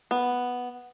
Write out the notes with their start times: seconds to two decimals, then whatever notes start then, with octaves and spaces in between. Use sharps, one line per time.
0.11 B3